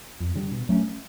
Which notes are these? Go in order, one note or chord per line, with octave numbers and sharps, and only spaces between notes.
F2
D3 G3
B2
F#3 A3 C#4